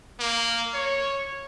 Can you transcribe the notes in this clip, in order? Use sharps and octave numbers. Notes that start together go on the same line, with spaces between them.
A#3
C#5